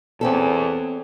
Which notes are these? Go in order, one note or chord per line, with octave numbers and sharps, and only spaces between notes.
E2 C4 C#4 A4